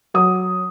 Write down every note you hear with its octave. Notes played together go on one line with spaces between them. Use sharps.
F#3 D#6